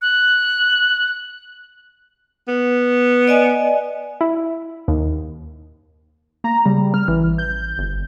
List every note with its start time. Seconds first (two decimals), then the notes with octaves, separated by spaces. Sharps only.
0.02 F#6
2.48 B3
3.28 D5 D#5 G#5
4.21 E4
4.88 D#2
6.44 A#3 A#5
6.66 C#3 G3
6.94 F6
7.08 A1 E3
7.38 G6
7.78 G1